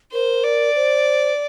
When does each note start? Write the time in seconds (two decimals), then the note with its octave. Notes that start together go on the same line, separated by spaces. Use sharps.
0.12 A#4 C5
0.44 D5
0.76 C5